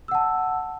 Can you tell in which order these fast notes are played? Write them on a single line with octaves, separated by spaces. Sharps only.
E6 F#5 A5